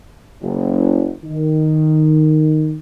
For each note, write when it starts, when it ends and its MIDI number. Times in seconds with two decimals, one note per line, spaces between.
0.42 1.11 30
1.24 2.78 51